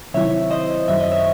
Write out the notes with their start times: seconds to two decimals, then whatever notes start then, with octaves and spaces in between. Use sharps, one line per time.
0.14 C3 D#3 F#3 C4 E4 C#5 E5
0.51 C5 D#5
0.88 F#2 D#3 F#3 E5
1.00 D#5
1.11 C#5 E5